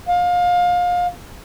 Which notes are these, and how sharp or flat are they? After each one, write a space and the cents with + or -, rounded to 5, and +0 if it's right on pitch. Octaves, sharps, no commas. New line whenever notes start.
F5 +25